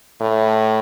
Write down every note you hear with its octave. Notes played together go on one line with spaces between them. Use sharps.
A2